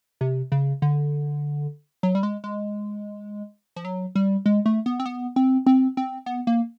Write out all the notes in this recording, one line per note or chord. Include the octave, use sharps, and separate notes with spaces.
C3
C#3
D3
F#3
G3
G#3
G#3
F3
F#3
G3
G#3
A3
B3
C4
B3
C4
C4
C4
B3
A#3